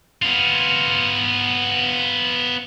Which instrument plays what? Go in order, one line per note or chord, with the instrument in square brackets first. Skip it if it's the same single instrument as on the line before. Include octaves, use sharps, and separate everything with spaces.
[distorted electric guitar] B3 F4